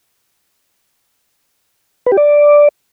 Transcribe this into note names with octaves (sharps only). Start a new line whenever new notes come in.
B4
G4
D5